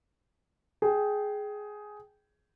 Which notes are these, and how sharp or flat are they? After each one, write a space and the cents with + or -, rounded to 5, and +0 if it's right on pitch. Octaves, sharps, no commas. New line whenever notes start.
G#4 +10 G5 -10